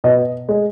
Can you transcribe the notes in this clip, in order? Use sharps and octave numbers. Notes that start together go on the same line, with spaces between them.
B2 D#5
G#3